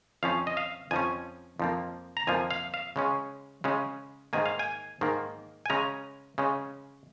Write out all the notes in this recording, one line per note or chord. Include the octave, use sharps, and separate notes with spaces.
F2 F3 C#4 F5
D#5
F5
F2 F3 C#4 G#5
F2 F3 A#3
A#5
F2 F3 A#3 G#5
F5
F5
C#3 G#3 C#4
C#3 G#3 C#4
G#2 D#3 A#3 G#5
F5
G#5
G#2 D#3 A#3
G#5
C#3 G#3 C#4 A#5
C#3 G#3 C#4